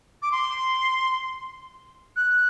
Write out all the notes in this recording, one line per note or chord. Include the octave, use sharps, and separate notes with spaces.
D6
C6
F#6